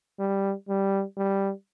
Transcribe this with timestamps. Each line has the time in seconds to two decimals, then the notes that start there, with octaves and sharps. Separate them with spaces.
0.19 G3
0.69 G3
1.17 G3